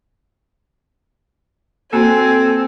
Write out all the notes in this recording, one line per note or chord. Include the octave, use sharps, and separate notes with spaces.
A#3 C4 F#4 A4 G#5